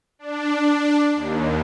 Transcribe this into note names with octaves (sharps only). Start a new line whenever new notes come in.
D4
D#2